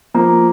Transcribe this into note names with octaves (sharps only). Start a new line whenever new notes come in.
F3 A#3